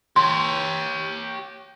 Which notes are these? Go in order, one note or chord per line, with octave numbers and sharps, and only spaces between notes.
G4 C#5 C6